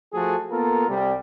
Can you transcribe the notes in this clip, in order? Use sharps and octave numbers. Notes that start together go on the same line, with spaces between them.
F3 A3 F#4 G#4 A4
A#3 B3 F4 A4 A#4
C2 G3